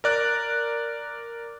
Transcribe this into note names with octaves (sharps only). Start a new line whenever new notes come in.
A#4 D5 F#6